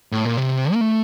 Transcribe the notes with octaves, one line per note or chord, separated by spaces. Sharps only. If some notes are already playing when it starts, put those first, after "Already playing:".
A2
A#2
C3
A#3
A3